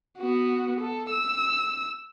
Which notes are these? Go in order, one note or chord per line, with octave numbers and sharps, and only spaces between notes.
B3 F#4
A4
E6